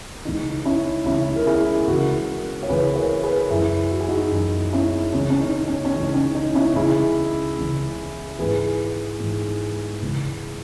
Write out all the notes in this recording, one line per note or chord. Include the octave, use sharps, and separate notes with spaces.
C#2 C#3 E3 D#4
C#4 E4
C#2 C#3 E3 C#4 E4
A#4
E4 G#4
C#2 C#3 E3 F#4 A#4
C#5
C#2 C#3 E3 G#4 B4
A#4 C#5
G#4 B4
F#2 E3 E4 G#4
F#4
G#4
D#4 F#4
F#2 E3
C#4 E4
C#2 C#3 E3 C#4
C#4
D#4
C#4
C#4
C#2 C#3 E3 D#4
C#4
D#4
C#4 E4
C#2 C#3 E3 E4 G#4
C#2 C#3 E3
G#2 E3 G#4 B4
G#2 E3
C#2 C#3 E3